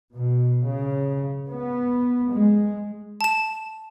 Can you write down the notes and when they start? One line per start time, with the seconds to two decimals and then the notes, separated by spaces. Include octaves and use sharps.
0.12 B2
0.64 C#3
1.50 B3
2.31 G#3
3.21 A5 E7